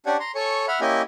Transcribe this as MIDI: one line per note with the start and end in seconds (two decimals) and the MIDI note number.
0.06 0.17 61
0.06 0.17 62
0.06 0.17 67
0.06 0.17 74
0.06 0.17 78
0.06 0.17 80
0.20 0.32 82
0.20 0.32 84
0.35 0.66 69
0.35 0.66 73
0.35 0.66 80
0.35 0.66 85
0.68 0.80 76
0.68 0.80 78
0.68 0.80 83
0.68 0.80 89
0.81 1.02 58
0.81 1.02 61
0.81 1.02 64
0.81 1.02 67
0.81 1.02 75
0.81 1.02 80